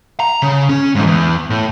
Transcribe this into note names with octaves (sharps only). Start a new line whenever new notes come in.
A#5
C#3
C#4
G#2 E3
E2
A2